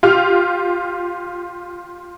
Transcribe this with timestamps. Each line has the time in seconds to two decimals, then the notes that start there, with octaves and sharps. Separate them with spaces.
0.03 F4 G4 F6